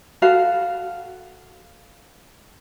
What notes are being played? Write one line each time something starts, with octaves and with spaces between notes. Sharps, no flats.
F#4 A4 F5 B5